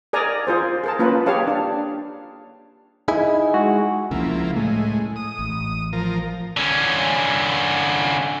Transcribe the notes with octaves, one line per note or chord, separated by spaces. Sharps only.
G#4 A#4 D5 G#5 A#5
F4 G#4 C5
G#4 A#4 A5
A#3 C#4 F4 B4
G4 G#4 C#5 F5 A5
D4
D#4 E4 G#4
G#3 F#4
C#2 C#3 F3 A#3 E4
A2 G#3 A3
D#6
A1
F3 A#4
D3 C#4